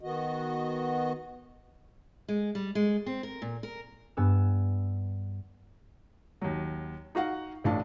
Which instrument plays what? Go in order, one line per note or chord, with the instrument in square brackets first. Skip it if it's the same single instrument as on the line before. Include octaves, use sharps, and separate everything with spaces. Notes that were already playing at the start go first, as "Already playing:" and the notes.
[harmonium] D#3 B3 F#4 D#5
[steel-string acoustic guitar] G#3
G3
G#3
C4
A#4
A#2
A#4
[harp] G2 B3 G#5 E6
[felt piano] D#2 F#3
D#4 F#4 F5 F#5
A1 A2 D4 F5 A5